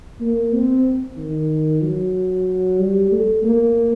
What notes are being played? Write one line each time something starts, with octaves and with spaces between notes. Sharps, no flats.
A#3
C4
D#3
F#3
G3
A3
A#3